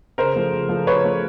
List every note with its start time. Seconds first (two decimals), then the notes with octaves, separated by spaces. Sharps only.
0.18 C#3 A#4 C5
0.36 F3 A3
0.53 C#3
0.69 F3 A3
0.87 C#3 B4 C#5
1.04 F3 A3